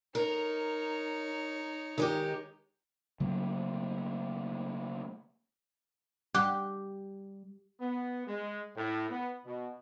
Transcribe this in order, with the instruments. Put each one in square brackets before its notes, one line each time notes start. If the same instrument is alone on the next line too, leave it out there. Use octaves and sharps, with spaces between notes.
[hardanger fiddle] D#4 C#5 [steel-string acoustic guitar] A#4
[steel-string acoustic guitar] D#3 G#3 G4
[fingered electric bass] C#3 F#3 A3 A#3
[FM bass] G3 [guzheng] G4 [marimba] D6 F#6
[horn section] B3
G#3
A2
B3
B2